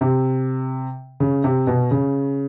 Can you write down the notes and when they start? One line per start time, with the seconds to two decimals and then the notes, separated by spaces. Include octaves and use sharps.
0.01 C3
1.20 C#3
1.44 C3
1.67 B2
1.91 C#3